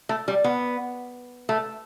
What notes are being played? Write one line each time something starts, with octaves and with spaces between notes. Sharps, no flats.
A3
G3
B3
A3